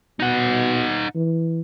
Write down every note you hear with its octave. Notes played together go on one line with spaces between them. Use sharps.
B2 D#4 F#5
E3